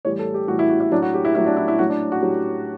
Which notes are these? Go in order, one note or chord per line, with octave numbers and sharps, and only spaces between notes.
A2 E3 G3 C#5
A4
G4
A2 E3 G3 F#4
E4
F#4
E4
A2 F#3 D4
F#4
G4
E4
A2 F#3 E4
D4
E4
E4
A2 F#3 F#4
D4
F#4
A2 F#3 G4